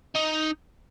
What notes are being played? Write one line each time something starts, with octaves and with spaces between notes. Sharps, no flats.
D#4